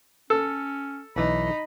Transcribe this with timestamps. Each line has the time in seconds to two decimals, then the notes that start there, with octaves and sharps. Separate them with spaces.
0.30 C#4 A4
1.16 B1 E3 D#4 B5